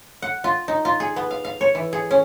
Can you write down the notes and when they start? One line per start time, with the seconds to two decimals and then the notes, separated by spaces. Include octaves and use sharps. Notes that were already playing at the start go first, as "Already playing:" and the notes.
0.22 F#5
0.44 F4
0.68 D#4
0.85 F4
1.00 G#4
1.16 B3
1.31 F5
1.45 F5
1.61 C#5
1.75 E3
1.93 G#4
2.11 C#4